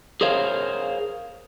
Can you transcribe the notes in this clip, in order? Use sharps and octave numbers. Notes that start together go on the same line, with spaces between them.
G#4 A#4 C5 C#5 F5